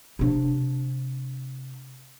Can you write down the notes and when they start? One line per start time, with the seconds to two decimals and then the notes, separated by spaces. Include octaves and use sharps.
0.19 C3 D4